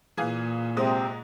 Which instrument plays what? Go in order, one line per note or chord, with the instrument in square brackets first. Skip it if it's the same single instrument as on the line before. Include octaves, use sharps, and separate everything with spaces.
[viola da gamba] A#2 [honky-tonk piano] E3 G#4 F5
[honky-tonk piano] G#2 G#3 D#6 [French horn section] C3 C4